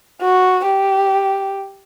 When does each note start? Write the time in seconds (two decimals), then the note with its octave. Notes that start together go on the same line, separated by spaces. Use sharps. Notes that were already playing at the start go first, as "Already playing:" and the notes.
0.21 F#4
0.66 G4